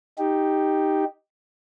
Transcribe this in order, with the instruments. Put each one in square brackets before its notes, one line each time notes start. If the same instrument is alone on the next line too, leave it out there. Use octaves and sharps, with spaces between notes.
[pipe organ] D#4 G4